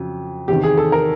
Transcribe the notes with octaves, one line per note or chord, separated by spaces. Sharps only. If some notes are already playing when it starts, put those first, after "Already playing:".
Already playing: F2 C#3 F#3
E2 C3 D#3 G4
G#4
A4
A#4